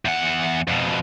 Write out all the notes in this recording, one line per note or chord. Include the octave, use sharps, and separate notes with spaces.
E2 F#5
F2 B2